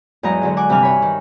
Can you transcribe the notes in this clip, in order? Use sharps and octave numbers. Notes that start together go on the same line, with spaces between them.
E2 G#2 F#3 D#5 A#5
D3 F#3 G#3
F#5 G#5 D6
G2 C3 E3 D4 G#5 F6
C#5 B5
D#3